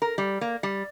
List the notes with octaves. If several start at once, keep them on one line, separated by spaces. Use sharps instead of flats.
A#4
G3
A#3
G3